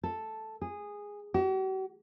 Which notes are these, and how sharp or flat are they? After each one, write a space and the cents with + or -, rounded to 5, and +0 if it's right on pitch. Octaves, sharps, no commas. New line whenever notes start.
A4 +0
G#4 -10
F#4 +45